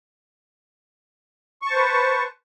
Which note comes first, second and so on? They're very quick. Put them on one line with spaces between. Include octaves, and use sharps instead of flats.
C#6 A5 C5 B4